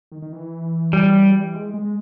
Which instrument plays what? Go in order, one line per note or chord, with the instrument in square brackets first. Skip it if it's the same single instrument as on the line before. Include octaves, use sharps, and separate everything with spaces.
[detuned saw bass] D#3
D#3
E3
[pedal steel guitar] G3
[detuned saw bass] G#3
G#3